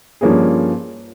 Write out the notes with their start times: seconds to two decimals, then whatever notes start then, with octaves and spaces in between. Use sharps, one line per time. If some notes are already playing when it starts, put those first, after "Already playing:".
0.21 G2 F3 A#3 C#4 G#4